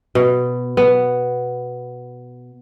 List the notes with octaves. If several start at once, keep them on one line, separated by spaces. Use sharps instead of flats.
B2
B3